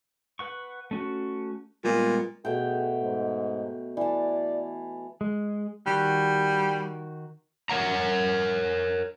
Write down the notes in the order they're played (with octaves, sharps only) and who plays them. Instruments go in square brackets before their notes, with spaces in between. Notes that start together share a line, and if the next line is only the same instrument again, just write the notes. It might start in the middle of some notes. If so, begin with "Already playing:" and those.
[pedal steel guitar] B4 F#5 C#6
A3 C#4 F#4
[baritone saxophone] A#2 [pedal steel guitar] G3 G#3 B3
[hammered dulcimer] B2 A3 G5 [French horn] G#4
[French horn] G#2
[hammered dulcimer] E3 A5 [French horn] D5
[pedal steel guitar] G#3
[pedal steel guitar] D#3 F#4 F#6 [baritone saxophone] G3
[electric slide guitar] A#4 C#5 F#5 A#5